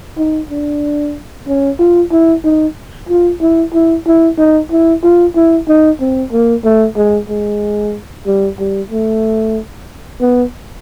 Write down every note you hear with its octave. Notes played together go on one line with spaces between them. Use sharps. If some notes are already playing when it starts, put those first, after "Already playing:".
D#4
D4
C#4
F4
E4
D#4
F4
E4
E4
E4
D#4
E4
F4
E4
D#4
C4
A#3
A3
G#3
G#3
G3
G3
A3
B3